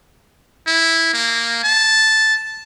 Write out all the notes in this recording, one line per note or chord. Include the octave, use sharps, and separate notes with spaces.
E4
A#3
A5